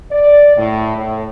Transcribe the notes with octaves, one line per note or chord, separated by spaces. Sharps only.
D5
A2
A2